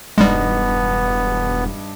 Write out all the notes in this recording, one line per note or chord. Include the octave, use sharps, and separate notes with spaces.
E1 G2 G3 G#3 B3 D#4